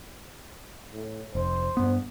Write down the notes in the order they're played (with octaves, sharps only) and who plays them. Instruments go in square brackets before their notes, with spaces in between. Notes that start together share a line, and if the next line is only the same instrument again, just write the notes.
[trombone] A2
[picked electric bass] F1 [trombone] C5
[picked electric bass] G2 B3